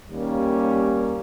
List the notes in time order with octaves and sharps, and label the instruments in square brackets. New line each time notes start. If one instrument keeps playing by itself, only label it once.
[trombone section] D#2 G3 A#3 C#4